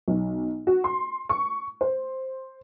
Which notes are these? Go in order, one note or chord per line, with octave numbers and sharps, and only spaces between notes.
B1
F#4
C6
C#6
C5